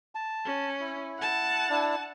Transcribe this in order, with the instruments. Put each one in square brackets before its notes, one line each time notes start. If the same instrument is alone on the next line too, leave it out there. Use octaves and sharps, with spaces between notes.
[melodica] A5
[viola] C#4
[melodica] E4
[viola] F#5 A5
[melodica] D4 E4